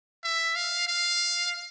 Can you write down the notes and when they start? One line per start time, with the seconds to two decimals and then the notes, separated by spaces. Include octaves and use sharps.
0.24 E5
0.56 F5
0.87 F5